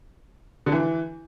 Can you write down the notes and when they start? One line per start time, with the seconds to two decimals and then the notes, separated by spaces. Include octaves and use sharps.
0.66 D3
0.72 E3